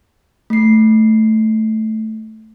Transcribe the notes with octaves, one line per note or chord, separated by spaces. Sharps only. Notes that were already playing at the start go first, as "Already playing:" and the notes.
A3 C7